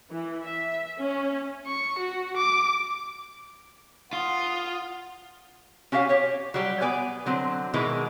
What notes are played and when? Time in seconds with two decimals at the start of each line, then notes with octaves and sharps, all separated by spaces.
0.10 E3
0.43 E5
0.98 C#4
1.67 C#6
1.99 F#4
2.37 D6
4.13 F4 F#5 D#6
5.92 C#4 F#4 G4 E5 F5 G#5
6.09 G4 C#5
6.54 F#3 G3 G4
6.81 B3 B4 D5 G#5
7.26 D3 F#3 C4
7.74 B2 D#3 E3 G#3